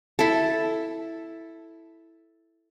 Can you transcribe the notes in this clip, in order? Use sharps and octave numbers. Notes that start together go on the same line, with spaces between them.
E4 A4